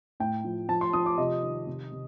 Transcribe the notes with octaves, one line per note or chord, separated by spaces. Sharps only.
A2 G5
F3
F3 A5
C6
F3 D#6
D6
C3 D#5
D#3
C3
C3